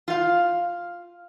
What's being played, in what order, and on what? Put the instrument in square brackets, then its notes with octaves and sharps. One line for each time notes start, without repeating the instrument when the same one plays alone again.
[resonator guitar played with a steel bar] F4 F5